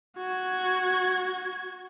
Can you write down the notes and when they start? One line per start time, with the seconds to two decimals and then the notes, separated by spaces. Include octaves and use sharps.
0.17 F#4 G#6